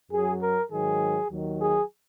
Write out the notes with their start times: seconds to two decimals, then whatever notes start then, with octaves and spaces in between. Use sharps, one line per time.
0.10 F#2 F#3 G#4
0.40 A#4
0.70 G#2 D#3 F#3 G#4
1.30 D#2 D#3 F#3
1.60 G#4